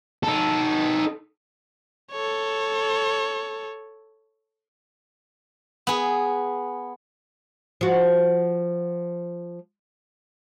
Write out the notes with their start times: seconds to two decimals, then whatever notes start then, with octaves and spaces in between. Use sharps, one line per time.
0.23 D#4 A4
2.13 A4 C#5
5.87 B3 G#4
7.81 F3 F#4